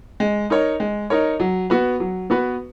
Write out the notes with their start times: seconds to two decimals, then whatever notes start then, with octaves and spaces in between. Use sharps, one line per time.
0.20 G#3
0.50 D#4 A#4 C#5
0.80 G#3
1.10 D#4 A#4 C#5
1.40 F#3
1.70 B3 F#4 B4
2.00 F#3
2.30 B3 F#4 B4